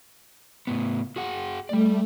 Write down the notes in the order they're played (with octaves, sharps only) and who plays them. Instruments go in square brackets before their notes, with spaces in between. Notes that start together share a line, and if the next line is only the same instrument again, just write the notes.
[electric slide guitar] A2 B3
F#4 G#4 F#5
[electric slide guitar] G3 D5 [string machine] A3